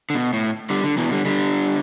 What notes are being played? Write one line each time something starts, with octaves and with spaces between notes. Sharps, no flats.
D3
B2
A2
D3 G3
D3
B2 E3
D3 G3
D3 G3